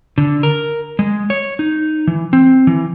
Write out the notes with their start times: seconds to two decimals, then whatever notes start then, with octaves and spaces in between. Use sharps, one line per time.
0.18 D3
0.43 A#4
0.99 G#3
1.30 C#5
1.59 D#4
2.07 E3
2.33 C4
2.67 E3